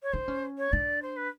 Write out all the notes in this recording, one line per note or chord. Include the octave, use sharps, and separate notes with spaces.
C#5
D4 C5
C#4
C#5
D4 D5
C5
B4